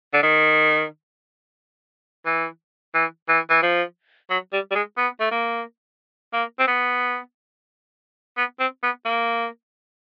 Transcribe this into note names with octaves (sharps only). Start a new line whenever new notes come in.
D3
D#3
E3
E3
E3
E3
F3
F#3
G3
G3
G#3
B3
A3
A#3
A#3
C4
B3
B3
C4
B3
A#3